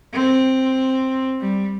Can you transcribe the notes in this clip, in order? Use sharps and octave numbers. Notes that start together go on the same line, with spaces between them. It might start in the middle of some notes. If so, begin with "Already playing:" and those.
C4
G3